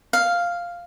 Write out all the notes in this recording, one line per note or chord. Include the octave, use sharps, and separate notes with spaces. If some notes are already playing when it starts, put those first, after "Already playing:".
F5